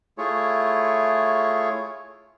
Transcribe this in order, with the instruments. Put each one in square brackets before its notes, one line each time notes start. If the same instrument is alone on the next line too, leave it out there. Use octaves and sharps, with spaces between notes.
[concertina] A3 E4 F4 G#4 C#5